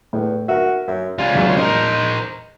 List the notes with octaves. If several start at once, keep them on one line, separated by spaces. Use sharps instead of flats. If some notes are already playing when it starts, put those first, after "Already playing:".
E2 A2
F#4 A#4 E5
F#2 E5
G3 C#4 F4
E2 F#3 G#3
D#4 A#4 C5